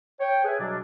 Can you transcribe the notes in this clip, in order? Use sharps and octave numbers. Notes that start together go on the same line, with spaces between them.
C#5 G5
G#4 B4 E5 G#5
B2 F#3 G3 D4